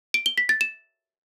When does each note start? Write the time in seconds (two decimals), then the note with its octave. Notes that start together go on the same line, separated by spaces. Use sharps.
0.14 D7
0.26 G7
0.38 B6
0.49 A6
0.61 E7